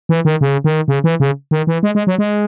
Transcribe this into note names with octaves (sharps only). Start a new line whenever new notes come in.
E3
D#3
C#3
D#3
C#3
E3
C#3
D#3
E3
G#3
G#3
F#3
G#3